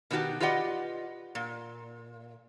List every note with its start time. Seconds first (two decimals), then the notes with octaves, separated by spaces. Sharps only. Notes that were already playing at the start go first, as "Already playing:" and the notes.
0.11 B2 D#3 B3 F#4 G4
0.40 F4 G4 B4 D5 D#5 F#5
1.35 A#2